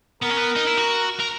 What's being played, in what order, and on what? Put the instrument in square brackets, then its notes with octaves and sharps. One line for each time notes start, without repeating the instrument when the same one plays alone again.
[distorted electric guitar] B3 [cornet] A#4
[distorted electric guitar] C#4
B3
D#4
E4
F#4
A#4